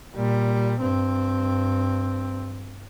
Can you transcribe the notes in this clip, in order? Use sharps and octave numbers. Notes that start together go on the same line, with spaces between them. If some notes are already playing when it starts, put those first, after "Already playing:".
A#2 G3
G2 C4